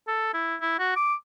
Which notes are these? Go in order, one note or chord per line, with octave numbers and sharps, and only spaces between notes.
A4
E4
E4
F#4
D6